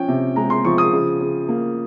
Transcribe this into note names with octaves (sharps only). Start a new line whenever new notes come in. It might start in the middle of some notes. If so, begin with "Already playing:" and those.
Already playing: F3 C#4 G5
C3
G#3 A#5
C6
F3 C#6
D#6
C#3
C#3
A#3